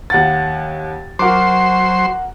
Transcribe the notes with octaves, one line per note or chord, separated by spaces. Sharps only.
D#2 F#5 A6
F#3 F#4 A#4 C5 C6 D6